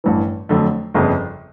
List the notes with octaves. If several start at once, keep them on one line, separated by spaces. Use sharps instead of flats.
A1 G2 E3
F2 D3 F#3 A3
G1 F2 C#3